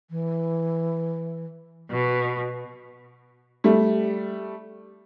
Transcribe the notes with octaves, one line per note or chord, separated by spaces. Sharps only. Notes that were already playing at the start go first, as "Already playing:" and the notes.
E3
B2
G3 A3